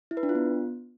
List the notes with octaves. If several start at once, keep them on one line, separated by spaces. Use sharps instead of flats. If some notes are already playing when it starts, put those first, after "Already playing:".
E4
B4
D4
F4
B3